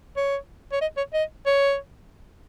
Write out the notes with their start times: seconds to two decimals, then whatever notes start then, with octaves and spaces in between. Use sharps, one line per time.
0.17 C#5
0.72 C#5
0.82 D#5
0.97 C#5
1.14 D#5
1.46 C#5